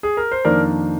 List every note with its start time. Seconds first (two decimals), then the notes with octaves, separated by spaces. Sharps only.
0.03 G#4
0.17 A#4
0.32 C5
0.45 F2 D#3 A#3 D4 A#4 D5